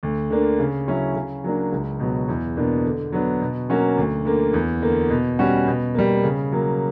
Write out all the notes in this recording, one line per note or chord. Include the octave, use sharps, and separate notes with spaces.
D2
D3 A#3 D4
C#3
F#3 C#4 E4
C#3
F#3 A#3 D4
C#2
B2 F#3
E2
B2 A#3 D4
D3
F#3 B3 D4
B2
F#3 A#3 C#4 F#4
D2
D3 A#3
E2
D3 A#3
B2
G3 C#4 F#4
B2
G3 A#3
C#3
F#3 A#3